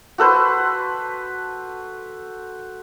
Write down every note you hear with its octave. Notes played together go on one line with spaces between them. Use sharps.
F#4 A4 B4 C5